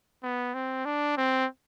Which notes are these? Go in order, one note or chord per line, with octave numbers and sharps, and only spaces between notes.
B3
C4
D4
C4